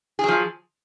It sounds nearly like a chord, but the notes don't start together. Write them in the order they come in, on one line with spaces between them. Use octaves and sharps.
G#4 F#3 F3